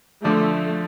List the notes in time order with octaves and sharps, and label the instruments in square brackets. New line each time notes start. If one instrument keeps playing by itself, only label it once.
[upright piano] D3 F3 D4 [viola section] A3